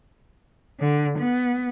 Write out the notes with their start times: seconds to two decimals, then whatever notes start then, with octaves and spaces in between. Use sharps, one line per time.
0.79 D3
1.18 B3